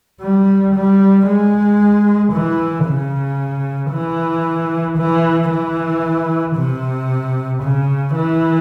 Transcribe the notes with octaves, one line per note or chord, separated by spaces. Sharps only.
G3
G3
G#3
E3
C#3
E3
E3
E3
C3
C#3
E3